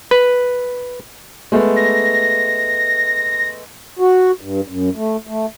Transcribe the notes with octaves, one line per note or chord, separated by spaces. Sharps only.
B4
G#3 A3 B3
A#6
F#4
G2
F#2
A3
A3